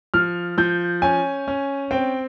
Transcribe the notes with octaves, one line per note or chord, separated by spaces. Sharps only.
F3 F6
F3 G6
C#4 G#5
C#4
C4 G5